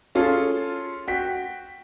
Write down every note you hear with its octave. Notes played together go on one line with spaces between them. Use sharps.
C#4 F4 G#4 A4
F#4 G5 B6